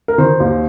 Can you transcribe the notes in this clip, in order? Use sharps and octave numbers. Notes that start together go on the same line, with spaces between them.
A#4
D#3 C5
D#2